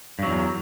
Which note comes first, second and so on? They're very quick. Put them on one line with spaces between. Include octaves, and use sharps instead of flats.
G2 F#3 E2